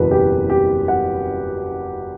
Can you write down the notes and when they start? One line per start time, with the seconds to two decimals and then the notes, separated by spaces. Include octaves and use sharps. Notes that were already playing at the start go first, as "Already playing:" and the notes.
Already playing: F#1 E2 B2 B4
0.11 G4
0.50 G4
0.88 F#5